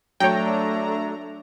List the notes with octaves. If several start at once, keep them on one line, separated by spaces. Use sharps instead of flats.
F#3 A3 D4 C#5 G5 A#5